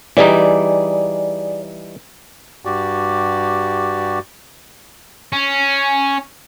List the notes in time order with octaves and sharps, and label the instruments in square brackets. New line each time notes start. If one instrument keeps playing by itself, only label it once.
[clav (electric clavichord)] E3 G3 D#4 [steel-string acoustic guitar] G#4 D5
[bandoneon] G2 F#4 G4 D5
[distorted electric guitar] C#4